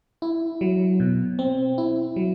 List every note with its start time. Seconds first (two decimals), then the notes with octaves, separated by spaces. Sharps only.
0.22 E4
0.61 F#3
1.00 B2
1.39 C4
1.78 E4
2.16 F#3